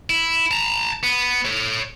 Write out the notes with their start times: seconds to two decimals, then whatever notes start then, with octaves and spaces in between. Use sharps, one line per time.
0.10 E4
0.51 A5 A#5
1.03 B3
1.45 A4 C#5